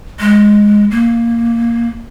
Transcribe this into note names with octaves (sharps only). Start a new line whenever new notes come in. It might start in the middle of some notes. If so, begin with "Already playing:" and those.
G#3
A#3